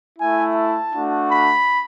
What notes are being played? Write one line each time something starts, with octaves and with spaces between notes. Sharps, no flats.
A3 E4 G#5
A5
A3 D4 F#4
B5